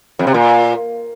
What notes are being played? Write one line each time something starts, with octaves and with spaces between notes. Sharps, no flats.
F2
C3
A#2